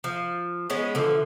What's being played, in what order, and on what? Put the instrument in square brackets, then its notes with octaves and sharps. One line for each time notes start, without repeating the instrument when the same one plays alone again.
[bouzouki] F3
G#3 B3 C#4
D3 E3 F3